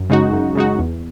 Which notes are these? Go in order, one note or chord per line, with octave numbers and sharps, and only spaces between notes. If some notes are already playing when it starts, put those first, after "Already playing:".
Already playing: F#2
C#3 G#3 D#4 F#4
F#2
C#3 G#3 D#4 F#4
E2